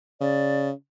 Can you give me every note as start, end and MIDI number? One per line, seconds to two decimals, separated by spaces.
0.21 0.71 49
0.21 0.67 74